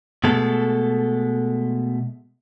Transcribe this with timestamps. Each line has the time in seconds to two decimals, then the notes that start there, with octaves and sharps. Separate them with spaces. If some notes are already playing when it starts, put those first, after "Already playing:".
0.24 B2 G#3 A3 A4